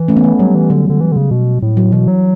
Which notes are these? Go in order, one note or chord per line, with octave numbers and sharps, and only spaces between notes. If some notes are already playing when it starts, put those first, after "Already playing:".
Already playing: E3
A3 C#4
B3
A3
F#3 G3
E3
D3 F#3
D3
E3
D3
C#3
B2
A2
F#3
B2 E3
F#3